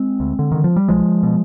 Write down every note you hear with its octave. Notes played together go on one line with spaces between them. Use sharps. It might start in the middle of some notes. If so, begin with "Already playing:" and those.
Already playing: G#3 C4
D2
D3
D3 D#3
F3
G3
B1 F3 G#3
B2